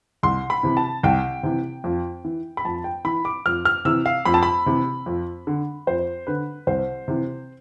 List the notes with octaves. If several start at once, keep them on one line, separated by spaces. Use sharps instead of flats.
C2 C6
B5
C3 E3
A5
C2 G5
C3 E3
F2
E3
B5
F2 A5
G5
E3 B5
D6
F2 F6
F6
C3 E3 E6
F5
F2 B5
A5
B5
C3 E3
F2
D3
F2 C5
D3 B4
C2 C5
C3 E3